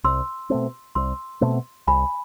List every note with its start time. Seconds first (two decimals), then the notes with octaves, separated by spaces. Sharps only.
0.04 C2 C6 E6
0.50 B2 A3 C4
0.95 C2 C6 E6
1.41 B2 A3 C4
1.87 C2 G#5 B5